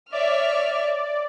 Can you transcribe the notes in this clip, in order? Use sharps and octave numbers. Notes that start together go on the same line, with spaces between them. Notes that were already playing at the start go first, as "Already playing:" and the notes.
C#5 D5 E5 F6